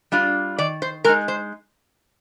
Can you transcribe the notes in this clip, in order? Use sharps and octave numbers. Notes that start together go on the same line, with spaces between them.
G3 D4 F4
D#3 D5
C5
G#3 D#4 A#4
C5